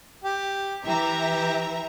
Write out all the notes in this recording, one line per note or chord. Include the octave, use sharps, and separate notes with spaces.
G4
E3 G4 E5 A#5